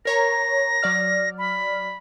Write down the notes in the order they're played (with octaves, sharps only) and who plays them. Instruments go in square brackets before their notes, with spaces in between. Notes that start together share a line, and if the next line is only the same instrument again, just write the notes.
[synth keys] A#4 C#5 A#5 [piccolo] A#6
[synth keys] F#3 D5 F6
[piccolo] B5